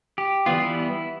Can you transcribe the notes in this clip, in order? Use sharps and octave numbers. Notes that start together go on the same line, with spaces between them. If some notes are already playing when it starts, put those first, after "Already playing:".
G4
E3 G3 B3 F4
E4